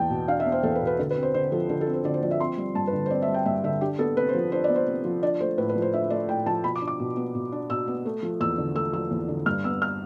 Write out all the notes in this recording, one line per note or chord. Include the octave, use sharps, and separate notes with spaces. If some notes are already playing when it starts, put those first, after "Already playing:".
Already playing: E2 B3 G5 A5
B2
D4 F5
E5
B3
C5
E2 A4
B4
B2
B4
D3 A4
B4
C4
C5
D3 C5
F3 A4
D3 A4
A4
C4
C5
D3 D5
C5
F3 D5
E5
C4 C6
G3
G2 A5
B4
D3
C5
C4 D5
E5
G3
G5
G2 E5
D3 E5
D4 G4
B3 A4
C3 B4
C5
F3
D4 C5
D5
B3
C5
C3
F3
D4 D5
A3 C5
A2 B4
B4
F3
C5
D4 E5
A3 D5
A2 G5
F3 A5
B2 B5
D6
D4
D6
B2
B3
B2
D4
B2 E6
B3
A3
F3
E2 E6
D3
A3 E6
F3 E6
E2
D3
G2 F6
B3 E6
F6